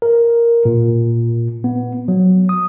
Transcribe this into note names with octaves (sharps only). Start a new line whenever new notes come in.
A#4
A#2
B3
F#3
D#6